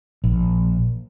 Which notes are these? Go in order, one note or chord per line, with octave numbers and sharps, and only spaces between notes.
A#1